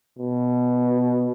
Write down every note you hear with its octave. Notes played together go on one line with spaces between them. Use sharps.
B2